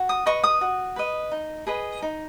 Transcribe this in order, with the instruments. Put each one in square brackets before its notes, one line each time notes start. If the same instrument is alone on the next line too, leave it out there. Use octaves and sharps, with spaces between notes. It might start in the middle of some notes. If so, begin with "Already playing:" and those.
Already playing: [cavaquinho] F#4
D#6
B4 D#5 C#6
D#6
F#4
B4 D#5
D#4
G#4 B4 D#5
D#4